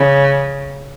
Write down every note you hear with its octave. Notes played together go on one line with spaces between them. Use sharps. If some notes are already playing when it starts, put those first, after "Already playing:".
Already playing: C#3